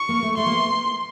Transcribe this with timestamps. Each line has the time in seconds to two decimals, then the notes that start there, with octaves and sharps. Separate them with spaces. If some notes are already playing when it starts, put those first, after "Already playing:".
Already playing: C#6
0.09 A#3
0.23 A3
0.37 A3 C6
0.46 A#3
0.52 B3